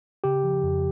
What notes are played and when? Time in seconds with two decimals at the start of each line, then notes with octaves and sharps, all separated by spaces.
0.24 C#3 G4
0.44 F3
0.63 F2